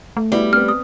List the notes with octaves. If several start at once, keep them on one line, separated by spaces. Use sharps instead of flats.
A3
G3 B3 E4 F#4
B3 C4 F6
D#6